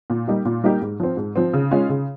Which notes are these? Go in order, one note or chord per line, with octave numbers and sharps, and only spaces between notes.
A#2
G3 A#3 D#4 G4
A#2
G3 A#3 D#4 G4
G#2
F3 C4
G#2
F3 C4
C#3
G#3 C#4 F4
C#3